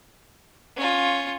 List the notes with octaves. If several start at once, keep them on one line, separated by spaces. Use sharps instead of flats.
C#4 F4